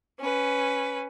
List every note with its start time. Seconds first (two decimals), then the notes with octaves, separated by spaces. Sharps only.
0.20 C#4 B4